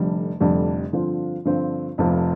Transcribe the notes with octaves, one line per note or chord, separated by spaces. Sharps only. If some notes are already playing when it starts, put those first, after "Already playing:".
Already playing: F1 F2 D3 G3
F1 F2 D3 G3
G2 D3 F3 C4 F4
G2 D3 F3 C4 F4
F1 F2 C3 F3